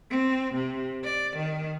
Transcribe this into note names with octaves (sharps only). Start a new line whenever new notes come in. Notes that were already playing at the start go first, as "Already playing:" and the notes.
C4
C3
D5
D#3